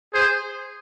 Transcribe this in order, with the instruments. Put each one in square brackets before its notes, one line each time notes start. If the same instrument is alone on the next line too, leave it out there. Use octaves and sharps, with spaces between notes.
[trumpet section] G#4 C5